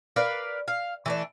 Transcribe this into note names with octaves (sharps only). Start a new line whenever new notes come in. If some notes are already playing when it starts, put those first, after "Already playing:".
A#4 B4 D5 F5
F5
E3 A3 D4